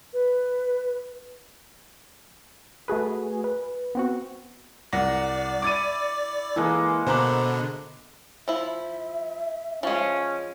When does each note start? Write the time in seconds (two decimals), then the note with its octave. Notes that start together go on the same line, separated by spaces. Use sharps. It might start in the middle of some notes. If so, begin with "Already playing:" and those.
0.14 B4
2.88 A3 F#4 G#4 B4
3.44 B4
3.95 B3 C4 F#4
4.93 C2 D5 F#5 A#6
5.62 E4 C#5 D6 A6 D#7
6.56 E3 G#3 A#3 A4
7.07 B2 D3 C5 A#5 B5 D6 F#6
8.48 F3 E4 E5
9.83 F3 G#3 C#4